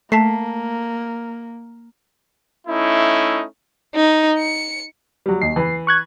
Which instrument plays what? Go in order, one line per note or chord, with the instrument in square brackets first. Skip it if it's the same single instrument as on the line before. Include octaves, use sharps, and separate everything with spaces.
[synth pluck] A3 [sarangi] A#3 [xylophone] A5 B6 C7
[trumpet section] A3 C#4 D#4 E4
[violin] D#4
C#7
[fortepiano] F#3 G3
[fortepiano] D#2 [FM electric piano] C7
[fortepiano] E3 B5
[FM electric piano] C#6 F#6 G#6